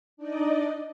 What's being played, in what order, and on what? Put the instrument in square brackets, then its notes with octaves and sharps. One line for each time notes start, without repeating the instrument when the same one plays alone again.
[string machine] D4 D#4 D5 D#5